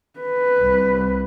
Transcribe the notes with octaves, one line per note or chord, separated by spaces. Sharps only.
B4
C2